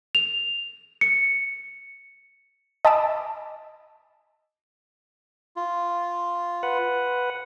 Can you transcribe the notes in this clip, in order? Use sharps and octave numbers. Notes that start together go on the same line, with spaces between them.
F7
C#7
D#5 G#5 A5 B5 D6 E6
F4
B4 F#5